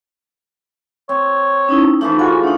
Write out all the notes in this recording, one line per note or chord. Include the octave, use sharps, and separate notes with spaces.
C4 C#5
C#4 D#4 E4
E3 F3 A3 D#4
F4 F#4 G#4 G#5
A3 D4 D#4